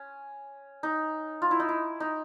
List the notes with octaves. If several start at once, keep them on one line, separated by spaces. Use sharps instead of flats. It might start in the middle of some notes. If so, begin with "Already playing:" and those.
Already playing: C#4
D#4
F4
E4
D#4
E4
D#4